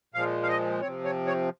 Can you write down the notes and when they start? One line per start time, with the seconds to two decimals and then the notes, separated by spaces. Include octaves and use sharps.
0.14 A#2 F3 G#3 F5
0.43 F5
0.48 D#5
0.81 C3 F3 C4 C#5
1.05 C#5
1.27 C#5